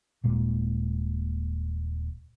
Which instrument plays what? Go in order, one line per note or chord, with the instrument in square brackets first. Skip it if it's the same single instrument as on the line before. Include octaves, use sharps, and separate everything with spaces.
[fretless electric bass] D#1 A#2 G#3